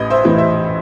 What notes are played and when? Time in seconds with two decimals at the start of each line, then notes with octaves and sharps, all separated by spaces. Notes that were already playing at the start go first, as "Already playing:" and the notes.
Already playing: A1 B4 D#5
0.10 C5 E5
0.25 A2 E3
0.38 C5 E5